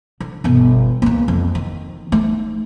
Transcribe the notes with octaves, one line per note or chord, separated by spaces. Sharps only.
D3
G1 B2
C#2 A#3
F2
D#3
A3 D#4